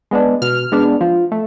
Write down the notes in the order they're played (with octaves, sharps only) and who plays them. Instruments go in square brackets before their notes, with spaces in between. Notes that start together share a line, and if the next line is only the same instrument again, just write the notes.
[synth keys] G#3 B3 D4
B2 F6
G#3 B3 D4
F3
A3